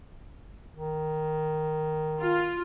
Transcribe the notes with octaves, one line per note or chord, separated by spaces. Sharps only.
D#3
F4